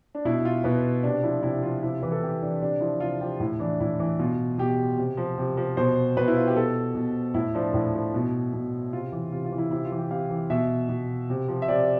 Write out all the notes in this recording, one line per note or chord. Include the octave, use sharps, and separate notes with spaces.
D4
B2 E4
F4
B2 B4
C3 D4
F3 E4
C3 E4
F3 F4
C3 E4
F4
E3 B4
A4
C3 G4
E3 D4
C3 D4
F3 E4
C3 F4
F3 G4
A2 E4
E3 D4
A2 E4
E3
B2 F4
B2 G4
C3
F3
C3
F3
B2 C5
B2 B4
E4
F4
G4
B2 A4
B2
A2 E4
F3 D4
A2 E4
F3
B2
B2
C3 F4
E3
C3 F4
F4
E3
E4
C3 E4
F4
E3
G4
C3 F5
E3
B2 E5
B2
C3
F3
E5
C3 D5